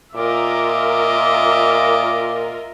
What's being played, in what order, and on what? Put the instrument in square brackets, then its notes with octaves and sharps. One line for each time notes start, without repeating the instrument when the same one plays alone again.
[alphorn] A#2 [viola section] F4 A#4 [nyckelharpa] D#5 E5 [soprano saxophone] D6